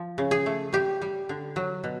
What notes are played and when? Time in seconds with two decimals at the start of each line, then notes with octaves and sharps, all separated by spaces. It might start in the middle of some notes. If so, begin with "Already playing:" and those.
Already playing: F3
0.18 C#3
0.31 G#4
0.46 A3
0.73 G3 G4
1.02 G3
1.29 D3
1.56 F#3
1.84 B2